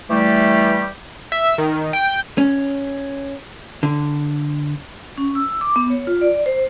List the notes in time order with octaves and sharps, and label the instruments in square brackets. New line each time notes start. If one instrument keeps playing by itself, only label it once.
[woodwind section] E3 G3 A3 G4
[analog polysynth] E5
D#3
G5
[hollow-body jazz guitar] C#4
D3
[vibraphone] C#4
E6
D6
B3
C#5
F4
D5
C5